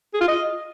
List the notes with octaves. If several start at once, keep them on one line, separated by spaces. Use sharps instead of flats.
G#4
F4
D#5